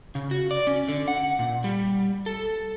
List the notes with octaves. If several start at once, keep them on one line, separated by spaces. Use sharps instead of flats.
C#3
F#4
D5
C#4
D3
F#5
A#2
G3
A4